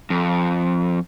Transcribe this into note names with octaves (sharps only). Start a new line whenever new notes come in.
F2